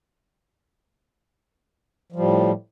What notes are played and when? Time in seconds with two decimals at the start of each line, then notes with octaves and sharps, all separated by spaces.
2.12 F3
2.16 G3
2.19 A2